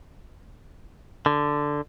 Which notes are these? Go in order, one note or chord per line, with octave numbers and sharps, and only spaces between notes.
D3